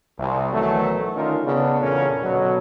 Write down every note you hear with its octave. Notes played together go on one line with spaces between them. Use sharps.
C2
B2 D#3 E3 F#3 A3
D3 D#3 C#4 D#4 F4 A#4
C#3 B3 D4
E2 A#2 C#3 A3 C#4 A#4
B2 D3 F#3